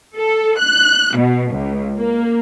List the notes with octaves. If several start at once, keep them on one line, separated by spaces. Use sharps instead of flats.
A4
F#6
B2
C#2
A#3